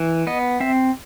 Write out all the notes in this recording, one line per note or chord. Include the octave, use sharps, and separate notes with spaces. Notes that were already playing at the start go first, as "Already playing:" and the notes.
Already playing: E3
B3 D#5
C4 E5